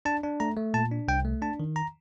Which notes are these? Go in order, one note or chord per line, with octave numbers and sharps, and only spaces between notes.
D4 A5
D4
A3 A#5
A3
A#2 A5
D4
C2 G5
A3
D4 A5
D#3
A#5